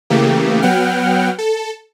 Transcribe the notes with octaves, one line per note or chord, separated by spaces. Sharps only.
C#3 E3 A3 A#3 G4
F#3 B3 F#5 G5 F6
A4